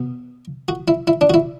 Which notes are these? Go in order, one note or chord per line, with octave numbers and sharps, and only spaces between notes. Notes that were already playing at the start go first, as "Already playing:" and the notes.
Already playing: B2
F#4
E4
E4
D4
F#4
E4